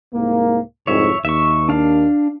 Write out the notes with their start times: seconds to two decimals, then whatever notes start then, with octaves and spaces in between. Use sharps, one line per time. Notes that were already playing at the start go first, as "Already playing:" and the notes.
0.13 C2 G#2 A#3
0.87 C2 F2 G#2 C#5 E5
1.25 D#2 E5 C#6
1.69 D4 F5